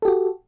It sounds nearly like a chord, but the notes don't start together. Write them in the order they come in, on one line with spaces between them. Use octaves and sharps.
A4 G4 F#4